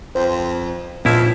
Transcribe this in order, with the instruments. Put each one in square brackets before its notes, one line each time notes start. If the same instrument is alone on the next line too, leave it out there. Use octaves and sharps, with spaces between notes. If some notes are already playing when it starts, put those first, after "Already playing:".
[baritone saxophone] F2 [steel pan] C5
[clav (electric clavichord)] C#2 C#3 E4 [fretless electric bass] A#2 B3 [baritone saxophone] F3